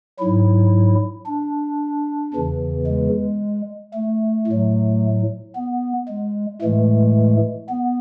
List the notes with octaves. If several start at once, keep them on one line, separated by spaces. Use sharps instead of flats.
G#2 F#3 E4
D4
E2 C#3 E3
G#3
A3
A2 F#3
B3
G#3
A2 E3 G#3 A3
B3